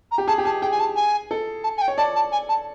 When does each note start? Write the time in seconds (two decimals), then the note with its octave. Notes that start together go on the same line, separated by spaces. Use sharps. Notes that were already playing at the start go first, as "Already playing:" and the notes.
0.11 A#5
0.18 G4
0.28 G#4 A5
0.38 G4
0.45 G#4 A5
0.62 G#4 G5
0.71 G#5
0.80 A5
0.96 G#5
1.31 A4
1.64 A5
1.77 G#5
1.81 G5
1.88 C#5
1.98 D5 A5
2.15 A5
2.32 G#5
2.49 A5